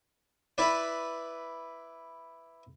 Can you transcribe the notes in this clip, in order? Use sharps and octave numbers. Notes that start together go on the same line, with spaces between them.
E4 B4 D5